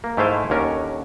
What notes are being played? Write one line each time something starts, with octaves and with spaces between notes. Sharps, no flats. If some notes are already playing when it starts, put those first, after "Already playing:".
A#3
G#2 A3 E4 C5 F5 G#5
D#2 D3 C#4 A#4